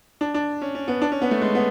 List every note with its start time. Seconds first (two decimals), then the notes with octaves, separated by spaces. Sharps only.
0.21 D4
0.34 D4
0.62 C#4
0.75 C#4
0.88 B3
1.02 D4
1.12 C#4
1.22 B3
1.31 A3
1.42 G#3
1.55 B3